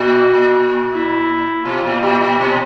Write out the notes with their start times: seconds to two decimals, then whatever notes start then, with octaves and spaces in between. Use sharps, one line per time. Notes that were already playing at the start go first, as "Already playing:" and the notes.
Already playing: A#2 F#4
0.92 E4
1.65 B2 F4
1.84 A#2
2.02 A#2 G4
2.21 A#2
2.40 B2